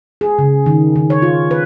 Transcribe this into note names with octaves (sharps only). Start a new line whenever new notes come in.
G#4
C#3
D#3
D#3
C#5
F4
B4